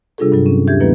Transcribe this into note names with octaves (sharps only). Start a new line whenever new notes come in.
C3 G3 D4 F4 G#4 A4
G2 C3 F#3
C4 C#4
D#2 D4 G4 E5 G6 G#6
D#3 F#3 A#3 B3 E4 B4